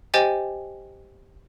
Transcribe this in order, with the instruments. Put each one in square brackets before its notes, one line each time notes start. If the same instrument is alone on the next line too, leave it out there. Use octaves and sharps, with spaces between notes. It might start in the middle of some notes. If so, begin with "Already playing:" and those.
[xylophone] G4 C5 D#5 G5 G#5 A6